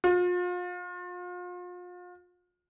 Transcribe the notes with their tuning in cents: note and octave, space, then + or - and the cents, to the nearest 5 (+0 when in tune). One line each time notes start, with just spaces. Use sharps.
F4 +35